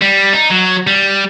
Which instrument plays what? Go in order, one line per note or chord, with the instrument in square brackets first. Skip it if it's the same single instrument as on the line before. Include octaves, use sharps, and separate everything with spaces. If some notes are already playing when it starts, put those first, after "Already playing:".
[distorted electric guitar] G3
D#4
F#3
G3